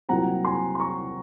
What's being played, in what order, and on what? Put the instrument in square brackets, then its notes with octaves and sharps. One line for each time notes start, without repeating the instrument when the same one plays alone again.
[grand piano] C2 A#2 F#3 C4 F#5 A#5
G#5 C6
C6
A#5 C#6